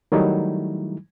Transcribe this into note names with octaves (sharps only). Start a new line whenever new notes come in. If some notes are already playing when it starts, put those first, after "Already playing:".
D#3 F#3 G3 A3 D#4 E4